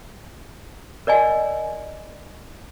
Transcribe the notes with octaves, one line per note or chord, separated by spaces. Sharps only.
A#4 D5 D#5 G#5